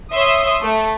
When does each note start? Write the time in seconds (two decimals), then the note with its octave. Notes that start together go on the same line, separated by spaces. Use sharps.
0.13 C#5 E5 C6 D#6
0.62 A3